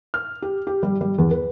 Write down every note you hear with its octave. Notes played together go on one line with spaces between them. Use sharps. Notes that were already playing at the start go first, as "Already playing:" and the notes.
F6
G4
G4
G3
G3
E2
B4